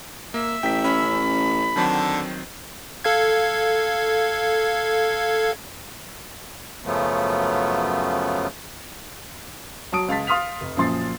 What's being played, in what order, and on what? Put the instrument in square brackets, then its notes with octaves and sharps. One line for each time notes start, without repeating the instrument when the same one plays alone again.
[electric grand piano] A#3 [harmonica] E5
[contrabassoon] A1 [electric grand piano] G5 B6
[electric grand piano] C#4 [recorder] B5
[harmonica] D3 A4 [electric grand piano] D#3 F#3 C4
[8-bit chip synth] A4 F5 G#6
[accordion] F#2 C#3 F3 F#3 A3 B3
[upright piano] F#3 A5 D#6 D7
C#2 F5 A5 A6 B6
F5 C6 D#6 F6 B6 F7
F1
F#2 A#2 F3 C6 A6 C7